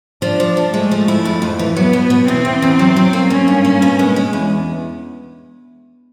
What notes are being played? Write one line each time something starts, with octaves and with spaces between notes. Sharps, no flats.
F3 D4
F3
F3
G#3 A3
F3
E4
F2
F2
E3
F#3 B3
B2
B2
E2 C4
E2
E2
F#3
F#3
A#3
A#3 C#4
G2
A#3
B2
G#3
G#3
E2